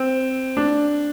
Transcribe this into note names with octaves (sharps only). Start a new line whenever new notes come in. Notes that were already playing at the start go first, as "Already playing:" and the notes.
Already playing: C4
D4